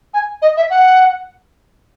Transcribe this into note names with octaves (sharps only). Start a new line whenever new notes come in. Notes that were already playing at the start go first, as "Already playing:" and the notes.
G#5
D#5
E5
F#5